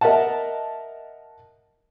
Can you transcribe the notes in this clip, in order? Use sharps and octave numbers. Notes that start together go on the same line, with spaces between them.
A#4 D#5 E5 F#5 A5